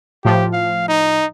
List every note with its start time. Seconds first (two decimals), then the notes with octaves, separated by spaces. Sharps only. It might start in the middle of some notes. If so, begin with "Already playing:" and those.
0.25 A2 F3 G4
0.53 F5
0.89 D#4